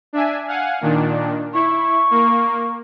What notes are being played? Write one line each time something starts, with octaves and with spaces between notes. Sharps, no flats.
D4 E5 G#5
F5 F#5 G#5
A#2 D#3 D4
E4 C#6
A#3